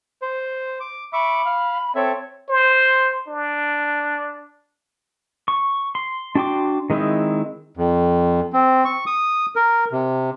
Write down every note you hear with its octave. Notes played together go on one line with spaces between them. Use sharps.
C5
D6
E5 B5 C#6 D6
F5
C4 A4 C#5 E5
C5
D4
C#6
C6
D4 F#4 G5 C6 D6
D#3 G#3 C4 D#4 E4
F2
C4
C#6
D#6
A#4
C3